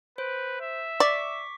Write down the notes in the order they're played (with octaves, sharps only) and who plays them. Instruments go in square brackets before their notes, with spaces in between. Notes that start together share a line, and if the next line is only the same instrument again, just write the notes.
[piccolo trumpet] B4 [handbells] C5
[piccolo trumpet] E5
[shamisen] D5 [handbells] C#6 D6 B6